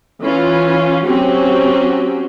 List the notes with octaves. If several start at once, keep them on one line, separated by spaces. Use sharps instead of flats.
E3 C#4 F4
F#3 C4 C#4 F#4 G4